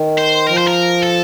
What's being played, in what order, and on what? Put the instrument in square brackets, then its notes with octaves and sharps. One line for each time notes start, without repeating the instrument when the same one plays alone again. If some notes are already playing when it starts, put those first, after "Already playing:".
Already playing: [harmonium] D#3
[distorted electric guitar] C5
[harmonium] F3 [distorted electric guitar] A#4
[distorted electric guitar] C5
A#4
A4